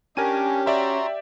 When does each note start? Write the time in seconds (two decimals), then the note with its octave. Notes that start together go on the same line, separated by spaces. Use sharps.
0.17 C#4 D4 G4 A#4 G#5 D#7
0.66 F#4 D5 E5 G5 A#5 C6